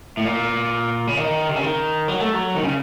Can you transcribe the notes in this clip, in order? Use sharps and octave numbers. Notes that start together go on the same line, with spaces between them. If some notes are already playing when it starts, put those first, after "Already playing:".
A2
A#2
C#3
D#3
C3
C#3
D#3
F#3
A3
F#3
D#3
C#3